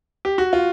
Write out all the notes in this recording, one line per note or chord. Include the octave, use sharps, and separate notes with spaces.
G4
F#4
F4